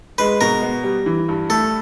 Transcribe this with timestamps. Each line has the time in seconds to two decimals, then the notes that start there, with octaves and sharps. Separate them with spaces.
0.18 G#3 B4
0.41 B2 A#4
0.62 B3
0.84 G3
1.06 E3
1.29 G2
1.50 A3 A4